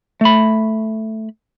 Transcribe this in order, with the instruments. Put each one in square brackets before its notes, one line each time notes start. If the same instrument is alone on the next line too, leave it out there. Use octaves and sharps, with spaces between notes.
[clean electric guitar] A3 B5